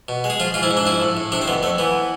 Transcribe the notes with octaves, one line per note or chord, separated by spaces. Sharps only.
B2
G#3
G#4
F3 F4
G#2 F4
E4
G#2
D4
F3 E4
A2
A2
C3 D4
C4
F2 B3
F2 A3
E3 B3